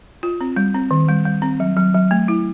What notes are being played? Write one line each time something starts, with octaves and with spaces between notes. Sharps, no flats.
F4
C4
G3
C4
D#3
G3
G3
C4
F#3
F#3
F#3
A3
E4